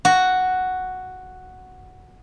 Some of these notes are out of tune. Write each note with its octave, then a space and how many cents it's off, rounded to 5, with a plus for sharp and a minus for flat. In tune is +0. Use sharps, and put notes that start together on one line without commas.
F#4 +0